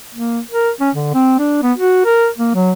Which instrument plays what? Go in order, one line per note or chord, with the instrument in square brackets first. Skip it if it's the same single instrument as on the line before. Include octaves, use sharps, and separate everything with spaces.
[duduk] A#3
A#4
C#4
D3
C4
D4
B3
F#4
A#4
A#3
F#3